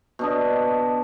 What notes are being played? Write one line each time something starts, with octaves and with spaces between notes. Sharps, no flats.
B2 D4 D#5